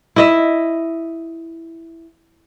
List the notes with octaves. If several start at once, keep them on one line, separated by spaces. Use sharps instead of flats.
E4 D#5 E5